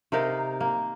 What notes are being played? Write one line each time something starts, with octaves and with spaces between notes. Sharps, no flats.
C3 D#4 A#4 F5
A#3